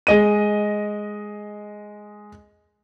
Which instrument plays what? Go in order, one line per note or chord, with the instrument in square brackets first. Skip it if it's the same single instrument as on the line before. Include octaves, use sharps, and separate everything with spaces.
[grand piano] G#3 D#5 D#7